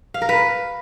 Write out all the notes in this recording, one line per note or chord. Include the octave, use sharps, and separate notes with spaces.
F5
A#4
B4